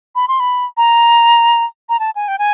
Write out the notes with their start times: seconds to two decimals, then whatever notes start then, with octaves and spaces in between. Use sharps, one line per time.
0.15 B5
0.28 C6
0.40 B5
0.77 A#5
1.89 A#5
2.00 A5
2.16 G#5
2.28 G5
2.39 G#5